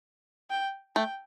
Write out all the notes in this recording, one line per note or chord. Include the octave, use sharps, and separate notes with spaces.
G5
A3 G5